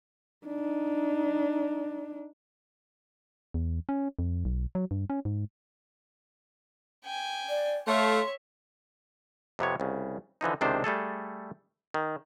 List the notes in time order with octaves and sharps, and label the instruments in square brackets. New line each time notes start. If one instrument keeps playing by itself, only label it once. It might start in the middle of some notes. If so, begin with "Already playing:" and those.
[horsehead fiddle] D4 D#4
[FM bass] E2
C#4
F2
B1
F#3
G2
C#4
G#2
[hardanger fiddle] G5 G#5
[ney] D5
[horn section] A3 F5 [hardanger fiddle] C#5 E5 [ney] C6
[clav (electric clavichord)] F2 C3 B3 C#5
C2 C#3
D3 E3 F3 D#4
C#2 C3 D#3 D4 C5 E5
G3 A3 G#4 A4
D#3